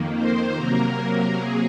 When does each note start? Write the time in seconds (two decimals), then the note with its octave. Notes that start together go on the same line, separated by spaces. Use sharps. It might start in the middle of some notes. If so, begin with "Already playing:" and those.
Already playing: F2 D#3 A#3
0.14 C5
0.55 C3 F#3 A#3 A#4
1.38 G#4